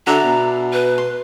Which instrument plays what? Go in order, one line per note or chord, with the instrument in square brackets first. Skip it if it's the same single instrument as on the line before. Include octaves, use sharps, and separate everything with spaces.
[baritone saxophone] D3 [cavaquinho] F#4 D5 E5 [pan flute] A#5
[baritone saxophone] B2
[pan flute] B4
[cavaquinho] C6